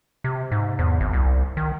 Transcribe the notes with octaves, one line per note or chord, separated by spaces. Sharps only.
C3
G#2
E2
G#1
C2
D#3